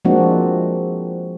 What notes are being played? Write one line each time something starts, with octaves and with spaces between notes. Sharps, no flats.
F3 G#3 A#3 C4 D4 F#4